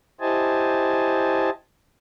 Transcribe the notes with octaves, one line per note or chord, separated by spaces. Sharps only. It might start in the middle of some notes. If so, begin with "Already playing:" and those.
E4 G4 C5 D#5 G#5 A5